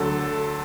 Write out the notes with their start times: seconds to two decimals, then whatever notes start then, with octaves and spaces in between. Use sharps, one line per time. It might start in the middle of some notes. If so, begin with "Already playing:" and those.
Already playing: D2 D3 F#3 A4